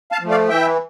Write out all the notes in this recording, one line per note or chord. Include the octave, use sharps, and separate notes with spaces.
F5 A5
F3 A3
D5 F5
E3 E5 G5